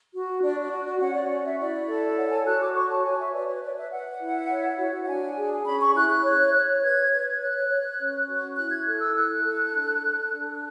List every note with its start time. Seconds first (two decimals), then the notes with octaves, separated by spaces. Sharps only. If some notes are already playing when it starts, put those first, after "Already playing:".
0.13 F#4
0.41 D4 D5
0.61 D5
0.70 F#4
1.00 C#4 F#5
1.14 D5
1.29 F#4 D5
1.43 E5
1.58 E4 D5
1.87 A4
2.16 C#5 F#5
2.31 G#5
2.45 F#4 F#6
2.60 D6
2.74 C#5 C#6
2.89 A5
3.03 C#5 G#5
3.18 E5
3.33 B4 D5
3.47 C#5
3.62 B4 D5
3.77 E5
3.91 B4 F#5
4.20 E4
4.49 C#5
4.78 F#4
5.02 F#5
5.08 D4 G#5
5.36 G#4
5.65 C#4 B5
5.80 C#6
5.95 E4 F#6
6.09 F#6
6.24 C#5
6.54 C#5
6.81 B4 G#6
7.11 B4
7.40 C#5 F#6
7.69 C#5
7.98 C#4
8.27 F#4
8.56 E4 F#6
8.71 G#6
8.86 A4 F#6
9.01 E6
9.15 E4 F#6
9.44 A4
9.73 D4
10.02 A4
10.31 D4